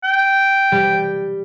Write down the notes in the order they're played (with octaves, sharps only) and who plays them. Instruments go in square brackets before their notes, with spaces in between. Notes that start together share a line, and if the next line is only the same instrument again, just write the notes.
[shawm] G5
[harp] G3